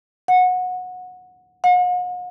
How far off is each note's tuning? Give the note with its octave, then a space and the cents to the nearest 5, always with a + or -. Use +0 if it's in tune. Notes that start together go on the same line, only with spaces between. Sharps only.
F#5 -20
F#5 -45